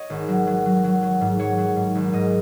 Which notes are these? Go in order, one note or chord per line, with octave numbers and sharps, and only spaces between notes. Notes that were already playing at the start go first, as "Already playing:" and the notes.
Already playing: C#5 D#5
G#1
F#3
F#3
F#3
F#3
F#3
G#2
F#3 C#5
F#3
G#2
G#1
G#2 D#5